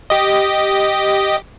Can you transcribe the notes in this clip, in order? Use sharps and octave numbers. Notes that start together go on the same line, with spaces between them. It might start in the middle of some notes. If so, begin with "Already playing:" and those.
G4 D#5